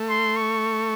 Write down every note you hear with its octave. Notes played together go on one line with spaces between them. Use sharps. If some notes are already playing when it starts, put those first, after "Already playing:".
Already playing: A3
C6
C#6